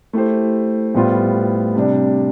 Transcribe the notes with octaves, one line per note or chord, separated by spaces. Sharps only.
A3 E4 G4 C5
A2 G3 B3 F4 C5
C3 G3 D4